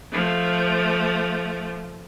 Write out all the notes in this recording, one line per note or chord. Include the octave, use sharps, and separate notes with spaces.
F3 A3